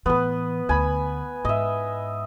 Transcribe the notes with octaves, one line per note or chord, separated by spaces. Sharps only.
A2 E3 B3 B4
D2 G#5 B5
G#2 D#5 E5